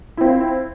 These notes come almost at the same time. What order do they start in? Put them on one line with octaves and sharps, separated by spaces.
E4 C4 F4